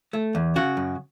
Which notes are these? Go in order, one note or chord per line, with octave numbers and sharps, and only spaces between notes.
A3
E2
C#3 F#4
F#2